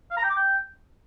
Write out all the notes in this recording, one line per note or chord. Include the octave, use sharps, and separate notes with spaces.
F5
A#5
G5
D6
G5